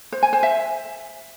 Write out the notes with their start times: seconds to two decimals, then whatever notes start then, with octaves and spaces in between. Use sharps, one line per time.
0.12 C5
0.23 G#5
0.33 C5
0.43 E5